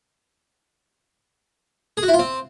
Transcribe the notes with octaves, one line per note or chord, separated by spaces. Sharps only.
G#4
F#4
E4
F4
C4